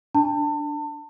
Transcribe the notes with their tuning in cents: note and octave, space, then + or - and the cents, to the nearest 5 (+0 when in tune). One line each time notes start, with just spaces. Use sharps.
D4 +0 A5 +30